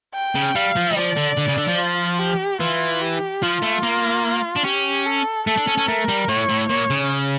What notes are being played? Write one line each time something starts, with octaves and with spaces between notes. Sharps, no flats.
G5
C#3
G3 F5
F3
G3
F3 D5
D3
D3
C#3
D3
F3
F4
G4
E3 F4
G4
F3 F4
A3
A#3
D4
C#4 G4
A4
A3 A4
D4
C#4
C#4
A3 A#4
G3
A2 C#5
A2
A#2 C#5
C#3